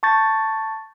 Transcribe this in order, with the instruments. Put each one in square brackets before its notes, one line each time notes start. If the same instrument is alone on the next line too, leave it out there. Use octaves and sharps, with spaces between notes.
[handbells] A5 C#6 G6 A6